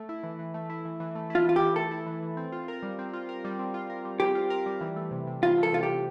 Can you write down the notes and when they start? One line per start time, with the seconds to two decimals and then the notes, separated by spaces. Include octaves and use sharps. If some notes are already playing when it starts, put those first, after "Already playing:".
Already playing: A3
0.09 E4
0.23 E3
0.39 E3
0.54 A3
0.70 E4
0.85 E3
1.00 E3
1.15 A3
1.30 E4 F4
1.46 E3 F4
1.56 E3 G4
1.76 A3 A4
1.91 E4
2.06 E3
2.23 E3
2.37 C4
2.52 F4
2.68 A#4
2.83 G3
2.99 C4
3.13 F4
3.29 A#4
3.45 G3
3.59 C4
3.74 F4
3.90 A#4
4.05 G3
4.20 C4 G4
4.35 F4
4.50 A#4
4.66 G3
4.81 E3
4.96 A3
5.11 C3
5.27 C3
5.43 E3 F4
5.58 A3 A4
5.72 C3 F4
5.83 G4
5.88 C3